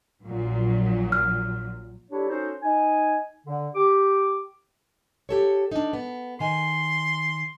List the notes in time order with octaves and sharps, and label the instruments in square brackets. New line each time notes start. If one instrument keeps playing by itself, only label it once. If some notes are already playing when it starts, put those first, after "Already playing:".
[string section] A#1 A#2 F#3
[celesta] F6
[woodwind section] G3 D4 E4 G4 A4 C#5
C#4 D#4 F#4 A4 C5
D#4 G#5
D3
G4 D6
[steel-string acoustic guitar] G4 A4 C#5
D4 D#4
B3
[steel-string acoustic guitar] D#3 G#5 [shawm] C6